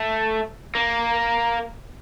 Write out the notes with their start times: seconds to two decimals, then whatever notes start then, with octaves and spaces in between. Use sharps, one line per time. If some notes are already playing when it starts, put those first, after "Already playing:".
Already playing: A3
0.75 A#3